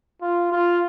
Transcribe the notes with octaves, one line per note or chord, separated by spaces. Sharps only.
F4
F4